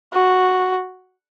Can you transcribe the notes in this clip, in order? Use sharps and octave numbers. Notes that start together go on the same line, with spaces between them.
F#4